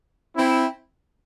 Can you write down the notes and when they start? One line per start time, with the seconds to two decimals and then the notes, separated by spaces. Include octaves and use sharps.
0.36 C4 E4